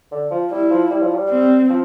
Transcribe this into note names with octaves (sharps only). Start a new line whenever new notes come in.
D3
F3
G3 E4
F3
G3
F3
G3
C4
F3